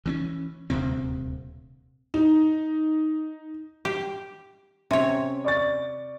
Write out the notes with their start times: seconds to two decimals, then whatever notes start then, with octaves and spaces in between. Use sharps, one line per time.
0.06 E3 C4 C#4
0.70 D#1 D2 C3 C4
2.14 D#4
3.85 G4
4.91 C3 C#4 C#5
5.44 D5 C#6 A6